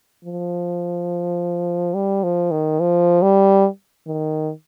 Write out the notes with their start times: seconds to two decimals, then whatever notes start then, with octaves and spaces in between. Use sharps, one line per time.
0.25 F3
1.94 G3
2.23 F3
2.51 D#3
2.80 F3
3.22 G3
4.07 D#3